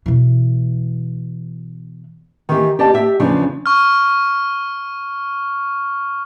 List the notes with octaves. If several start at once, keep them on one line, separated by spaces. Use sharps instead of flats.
B2 E3
D#3 E3 G4
G4 D5 D#5 A5
G4 E5
E2 C#3 F3 D4
C#6 F6